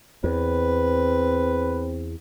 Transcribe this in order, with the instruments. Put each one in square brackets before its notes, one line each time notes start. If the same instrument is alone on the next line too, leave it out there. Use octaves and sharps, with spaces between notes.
[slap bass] E2 [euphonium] C4 [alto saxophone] B4